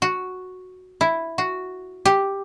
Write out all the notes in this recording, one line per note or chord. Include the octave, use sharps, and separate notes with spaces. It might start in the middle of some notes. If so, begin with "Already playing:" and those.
F#4
E4
F#4
G4